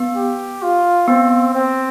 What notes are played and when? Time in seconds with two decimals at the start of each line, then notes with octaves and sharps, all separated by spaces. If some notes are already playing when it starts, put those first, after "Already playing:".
Already playing: B3
0.16 G4
0.62 F4
1.08 B3 C4
1.54 C4